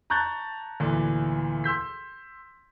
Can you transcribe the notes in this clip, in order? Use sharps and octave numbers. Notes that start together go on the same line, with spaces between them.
A5 A#5 C#6 F#6 G6 A6
D2 A#2 E3
C6 E6 G6 B6